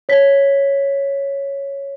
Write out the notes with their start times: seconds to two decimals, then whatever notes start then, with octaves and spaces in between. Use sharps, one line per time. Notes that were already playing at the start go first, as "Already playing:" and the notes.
0.09 C#5 B6